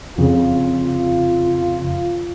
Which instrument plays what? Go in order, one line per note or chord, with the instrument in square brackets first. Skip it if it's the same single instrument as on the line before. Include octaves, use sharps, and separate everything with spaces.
[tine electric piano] F2 C#3 [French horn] F4